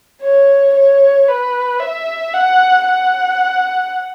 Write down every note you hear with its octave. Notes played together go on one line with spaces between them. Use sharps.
C#5
C#5
B4
E5
F#5
F#5